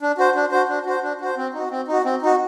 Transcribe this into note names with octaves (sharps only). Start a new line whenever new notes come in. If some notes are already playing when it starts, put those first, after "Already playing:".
D4
F#4 C5
D4
F#4 C5
D4
F#4 C5
D4
F#4 C5
C4
D#4 F#4
C4
D#4 F#4
C4
D#4 F#4